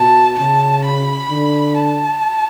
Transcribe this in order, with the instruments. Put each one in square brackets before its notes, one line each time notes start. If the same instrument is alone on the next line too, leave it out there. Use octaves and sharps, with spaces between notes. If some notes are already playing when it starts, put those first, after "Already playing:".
Already playing: [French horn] B2 [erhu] A5
[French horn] C#3 [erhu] A5
[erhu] B5
[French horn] D3
[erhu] A5